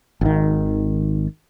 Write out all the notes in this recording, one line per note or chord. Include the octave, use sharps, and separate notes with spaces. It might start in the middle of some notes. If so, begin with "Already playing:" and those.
G#1 D#3